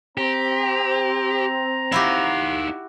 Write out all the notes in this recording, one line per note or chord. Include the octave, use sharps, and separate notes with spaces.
C4 G4 A#5
D#4 E4 F#4 G4 F5